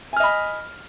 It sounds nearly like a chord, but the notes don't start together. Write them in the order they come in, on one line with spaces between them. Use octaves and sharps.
G#5 F6 D#5 B5